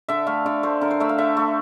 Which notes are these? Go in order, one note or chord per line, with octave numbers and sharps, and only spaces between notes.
D3 E5
A3 F5
D3 E5
A3 C5
D3 A#4
C5
A3 E5
F5
D3 E5
A3